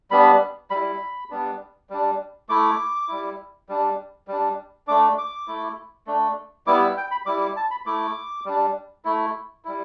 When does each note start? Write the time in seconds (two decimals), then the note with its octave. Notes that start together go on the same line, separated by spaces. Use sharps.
0.11 G3 B3 D4 B5
0.70 G3 E4 B5
1.31 G3 B3 D4
1.90 G3 D4
2.49 A3 E4 D6
3.08 G3 E4
3.69 G3 D4
4.28 G3 D4
4.87 A3 D4 D6
5.18 D6
5.48 A3 E4
6.07 A3 D4
6.67 G3 B3 E4 D6
6.82 E6
6.97 G5
7.11 B5
7.26 G3 E4 D6
7.41 D6
7.56 A5
7.71 B5
7.86 A3 E4 D6
8.45 G3 D4
9.05 A3 E4
9.65 G3 E4